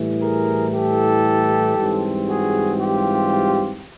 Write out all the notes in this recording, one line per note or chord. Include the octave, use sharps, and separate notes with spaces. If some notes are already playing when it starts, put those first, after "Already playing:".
Already playing: A2 E3 G3
G#4 A#4
G4 A4
G#2 E3 G3 C4
F#4 G#4
F4 G4